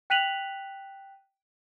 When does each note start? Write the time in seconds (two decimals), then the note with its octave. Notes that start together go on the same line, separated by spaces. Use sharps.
0.10 G5 F#6 B6 D#7 F7 F#7